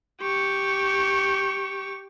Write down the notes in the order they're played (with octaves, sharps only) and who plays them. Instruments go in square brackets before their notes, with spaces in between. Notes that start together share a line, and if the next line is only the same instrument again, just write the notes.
[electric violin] G4 C#6